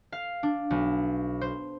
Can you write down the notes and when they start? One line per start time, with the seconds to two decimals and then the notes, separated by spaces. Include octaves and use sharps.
0.12 F5
0.43 D4
0.70 B1
1.41 C5